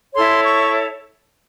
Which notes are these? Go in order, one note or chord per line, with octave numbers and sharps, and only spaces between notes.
E4 A4 C#5 C6
C#6